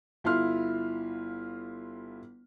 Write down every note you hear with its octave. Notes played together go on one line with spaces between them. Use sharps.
G1 E4 F4 C6 F6